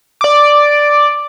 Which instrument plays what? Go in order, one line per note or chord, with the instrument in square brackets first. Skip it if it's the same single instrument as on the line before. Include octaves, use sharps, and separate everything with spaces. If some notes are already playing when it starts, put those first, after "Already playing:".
[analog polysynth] D5 D6